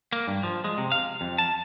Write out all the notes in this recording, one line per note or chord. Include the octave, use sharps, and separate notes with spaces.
A#3
G2
F3
G#3
C3
F5
F2
A5